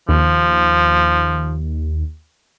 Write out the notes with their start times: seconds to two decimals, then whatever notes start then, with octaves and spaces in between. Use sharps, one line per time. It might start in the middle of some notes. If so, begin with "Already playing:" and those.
0.09 D#2 F3